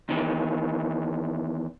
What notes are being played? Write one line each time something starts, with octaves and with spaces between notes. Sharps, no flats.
E2 D#3 E3